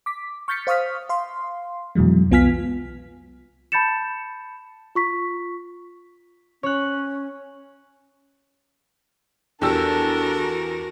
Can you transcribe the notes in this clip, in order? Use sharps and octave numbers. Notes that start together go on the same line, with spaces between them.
D6 B6
C#6 F6 G6 A6 B6 C#7
C5 F5 C#6 D#6 F6 B6
F5 C6
F2 B2 E3 F#3 G#3
C2 B3 F4 G#5 F6 B6
A5 B5 G6 A6 C#7 E7
F4 C#6 B6
C#4 C#5 F#6
E2 D4 F#4 G4 A4 A#4 E6